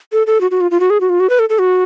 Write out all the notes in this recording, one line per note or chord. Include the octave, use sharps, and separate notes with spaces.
A4
A4
F#4
F#4
F4
F4
F#4
G#4
F#4
F4
F#4
B4
A4
A4
F#4